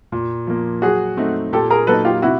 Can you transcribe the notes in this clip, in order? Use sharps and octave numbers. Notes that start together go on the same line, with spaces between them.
A#2
F3 A#3
F#3 F#4 G#4
A3 C4 D#4
A#2 G4 A4
G#4 A#4
F#3 A#3 D#4 A4 B4
F4 G4
C3 E4 F#4